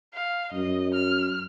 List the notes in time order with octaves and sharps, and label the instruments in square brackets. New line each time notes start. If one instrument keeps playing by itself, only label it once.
[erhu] F5
[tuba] F#2 [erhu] D#5
[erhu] F6